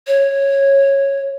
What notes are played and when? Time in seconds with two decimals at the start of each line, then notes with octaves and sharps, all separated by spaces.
0.07 C#5